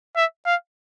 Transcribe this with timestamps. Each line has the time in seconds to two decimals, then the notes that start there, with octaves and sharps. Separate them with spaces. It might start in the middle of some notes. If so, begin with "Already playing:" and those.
0.16 E5
0.46 F5